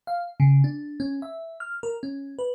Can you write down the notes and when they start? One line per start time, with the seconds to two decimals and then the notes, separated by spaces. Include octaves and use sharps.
0.07 F5
0.40 C#3
0.64 D4
1.00 C#4
1.22 E5
1.60 F6
1.83 A#4
2.03 C#4
2.39 B4